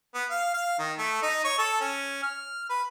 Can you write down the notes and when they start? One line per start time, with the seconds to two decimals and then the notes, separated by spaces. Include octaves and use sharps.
0.15 B3
0.30 F5
0.54 F5
0.79 D#3
0.98 A3
1.23 D#4
1.45 C#5
1.59 A4
1.81 C#4
2.23 F6
2.70 B4